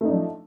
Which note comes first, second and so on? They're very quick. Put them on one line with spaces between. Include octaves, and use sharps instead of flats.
A3 D#4 D4 F3